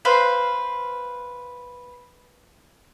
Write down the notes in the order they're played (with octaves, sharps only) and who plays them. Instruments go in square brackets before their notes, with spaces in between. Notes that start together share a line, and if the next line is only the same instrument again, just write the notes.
[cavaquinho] B4 C5 F5